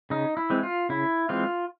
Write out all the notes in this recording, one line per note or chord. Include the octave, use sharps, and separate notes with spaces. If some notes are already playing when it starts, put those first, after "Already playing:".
C#3 D#4
E4
E3 G#3 C4
F4
C#3 E4
E3 G#3 C4 F4